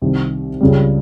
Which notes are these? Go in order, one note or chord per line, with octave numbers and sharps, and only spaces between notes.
C2 C3 D#3
C#2 C#3 G3